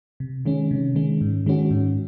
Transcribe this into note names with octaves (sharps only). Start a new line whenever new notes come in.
C3
D#3 G#3 C#4
C3
D#3 G#3 C#4
G#2
D#3 G#3 C#4 F#4
G#2